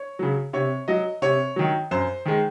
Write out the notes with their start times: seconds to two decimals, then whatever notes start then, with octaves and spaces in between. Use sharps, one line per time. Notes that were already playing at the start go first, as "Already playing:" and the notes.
Already playing: C#5
0.19 C#3 F#3
0.53 C3 C#5
0.88 F#3 D#5
1.22 C3 C#5
1.56 D#3 F#3
1.91 F#2 C5
2.26 D#3 G#3